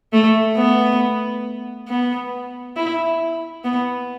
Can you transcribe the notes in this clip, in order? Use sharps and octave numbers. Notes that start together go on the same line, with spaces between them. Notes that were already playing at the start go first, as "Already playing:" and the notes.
A3
B3
B3
E4
B3